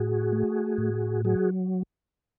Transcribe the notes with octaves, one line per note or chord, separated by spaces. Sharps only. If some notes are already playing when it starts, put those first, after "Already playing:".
Already playing: A2 F#4 G#4
A3
A2
F#3 F#4 G#4